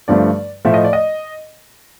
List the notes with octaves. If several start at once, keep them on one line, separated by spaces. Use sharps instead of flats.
G2 D3 F3 A3 D5
A2 F3 A3 E5
D#5
D5
D#5